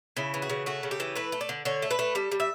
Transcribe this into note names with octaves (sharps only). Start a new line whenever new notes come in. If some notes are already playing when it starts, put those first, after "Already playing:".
C#3 E4
E3
F#4
C#3
A3 F#4
C#3
G4
E3
A3 B4
A3
D5
D3
D3 C#5
A3
B4
A3
G3 A4
G3
E5